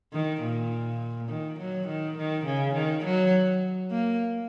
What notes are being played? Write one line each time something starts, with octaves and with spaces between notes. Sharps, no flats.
D#3
A#2
D#3
F#3
D#3
D#3
C#3
D#3
F#3
A#3